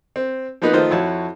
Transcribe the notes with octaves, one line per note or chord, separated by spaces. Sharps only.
C4
F3 A#3 B3 D#4 B4
D#3 F3 A3 F4 C5 D#5
F2 E4 F#4 C#5 A5